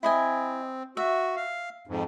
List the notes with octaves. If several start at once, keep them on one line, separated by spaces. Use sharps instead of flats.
C4 E4 D#5 G#5
F#4 E5
F5
F2 G#2